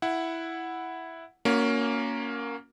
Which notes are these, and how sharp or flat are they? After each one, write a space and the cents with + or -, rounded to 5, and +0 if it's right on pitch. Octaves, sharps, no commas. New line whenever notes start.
E4 +0 F#5 +0
A#3 +0 C#4 +15 F#4 -25